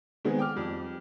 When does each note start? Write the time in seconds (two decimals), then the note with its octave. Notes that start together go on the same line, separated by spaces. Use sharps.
0.25 D#3 G#3 B3 C4 G#4
0.39 G5 D6 F6
0.56 F2 G3